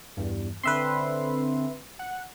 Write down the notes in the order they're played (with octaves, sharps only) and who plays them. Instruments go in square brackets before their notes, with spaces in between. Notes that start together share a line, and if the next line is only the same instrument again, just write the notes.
[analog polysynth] E2 G2
[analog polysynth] D3 C4 [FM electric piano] B4 E5 C6
[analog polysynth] F#5